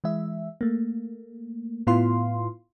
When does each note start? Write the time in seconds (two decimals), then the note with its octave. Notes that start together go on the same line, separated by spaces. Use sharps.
0.04 E3 G#3 E5
0.61 A3 A#3
1.87 A2 B3 E4 F4 F5 C6